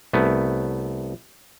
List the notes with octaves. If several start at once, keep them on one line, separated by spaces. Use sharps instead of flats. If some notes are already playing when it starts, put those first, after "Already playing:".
C2 A3 B3